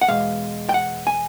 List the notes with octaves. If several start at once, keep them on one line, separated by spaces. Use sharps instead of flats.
F#5
E2 B2 G#3 F5
G5
F#5
G#5